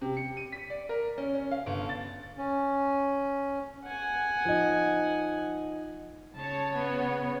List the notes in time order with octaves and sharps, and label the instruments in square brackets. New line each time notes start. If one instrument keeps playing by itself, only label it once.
[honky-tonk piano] C3
C#7
D#7
B6
D5
A#4
C#4
C#4
F5
G1
A6
[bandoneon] C#4
[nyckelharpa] F#5 G#5
[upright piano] F3 D#4
[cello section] C#3 C#5 [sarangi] A5
[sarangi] B3